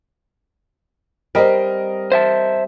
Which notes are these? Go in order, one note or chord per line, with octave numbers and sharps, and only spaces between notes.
G3 C4 A#4 D#5
C5 E5 A5